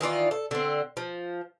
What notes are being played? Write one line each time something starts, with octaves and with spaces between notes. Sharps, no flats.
D#3 E3 F4 D5
A4
D3 C4
F3